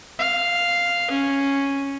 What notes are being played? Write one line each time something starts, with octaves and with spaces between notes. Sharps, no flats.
F5
C#4